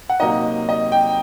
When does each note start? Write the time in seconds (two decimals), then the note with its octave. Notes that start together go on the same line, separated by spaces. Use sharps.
0.10 F#5
0.20 C3 F#3 A#3 D#4 D#5
0.69 D#5
0.92 G5